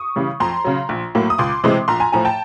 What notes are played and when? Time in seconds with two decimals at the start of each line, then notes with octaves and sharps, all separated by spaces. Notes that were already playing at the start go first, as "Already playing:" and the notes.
Already playing: C#6 D#6
0.16 C#3 E3 G3
0.40 F2 A#5 C6
0.64 C#3 F#3
0.89 A#1
1.15 A2 F#3 A#3
1.30 D#6
1.38 C#2 C6 D6
1.64 C3 E3 G#3 C4
1.88 A#1 A#5 C6
2.00 G#5 A#5
2.12 A2 F3 G#5 A#5
2.25 G5 A5